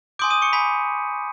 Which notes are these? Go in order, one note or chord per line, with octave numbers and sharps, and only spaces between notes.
G#5 C6 D6 D#6 G6 D7
D#6 D#7
C#6 C#7
G#5 B5 B6